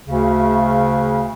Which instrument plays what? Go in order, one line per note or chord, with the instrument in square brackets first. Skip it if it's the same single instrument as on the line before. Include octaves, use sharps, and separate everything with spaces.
[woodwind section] D2 C#3